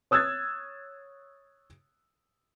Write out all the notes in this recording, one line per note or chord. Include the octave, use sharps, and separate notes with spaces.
C#5 D#6 E6 F#6 G#6 A6